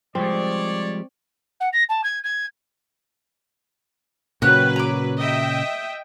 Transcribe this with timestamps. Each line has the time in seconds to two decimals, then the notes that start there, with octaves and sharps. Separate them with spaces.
0.15 F3 G3 G#3 C4 C#5 D5
1.60 F#5
1.73 A#6
1.89 A5
2.03 G#6
2.24 G#6
4.42 A#2 C#3 F#3 F#4 G4 B4 F#6
4.76 A#5 D6
5.17 D#5 E5 G5